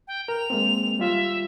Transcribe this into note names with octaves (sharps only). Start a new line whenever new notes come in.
G5
A#4 F7
G#3 A#3 C4
G3 F4 E5